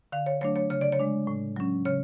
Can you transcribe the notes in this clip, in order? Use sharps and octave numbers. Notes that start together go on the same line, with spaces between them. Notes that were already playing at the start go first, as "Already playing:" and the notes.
D3 F5
C#5
F#3 A3 D4 C#5
C#5
C#3 C#5
D5
C#5
G#3 D4
A2
F#3 C#4
C#3 C#5